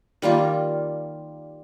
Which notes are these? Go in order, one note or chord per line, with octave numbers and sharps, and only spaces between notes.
D#3 G3 A#3 F4